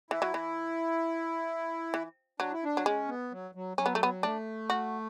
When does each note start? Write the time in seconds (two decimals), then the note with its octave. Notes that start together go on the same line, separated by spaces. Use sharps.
0.10 E3 E4
0.22 F#3
0.34 E3
1.94 E3
2.40 F#3 D4
2.52 E4
2.64 D4
2.77 F#3
2.86 G#3 C#4
3.09 B3
3.32 F#3
3.55 F#3
3.77 F#3 C#4
3.86 B3
3.95 A3
4.03 B3
4.23 A3 D4
4.70 F#4